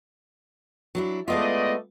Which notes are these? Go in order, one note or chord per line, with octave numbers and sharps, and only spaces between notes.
F#3 D4 E4
G#3 A3 B3 F4 D5 D#5